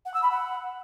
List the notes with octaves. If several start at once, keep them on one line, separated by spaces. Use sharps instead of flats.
F#5
E6
B5
F#5